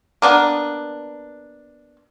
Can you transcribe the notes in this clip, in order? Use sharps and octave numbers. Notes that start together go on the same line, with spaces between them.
A#3 B3 D4